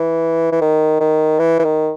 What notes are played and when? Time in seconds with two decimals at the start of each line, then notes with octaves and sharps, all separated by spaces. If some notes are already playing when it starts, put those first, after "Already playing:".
Already playing: E3
0.52 E3
0.61 D#3
1.00 D#3
1.39 E3
1.59 E3
1.64 D#3